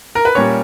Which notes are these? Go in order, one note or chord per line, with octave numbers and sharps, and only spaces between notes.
A#4
B4
A#2 G3 A#3 C#4 C#5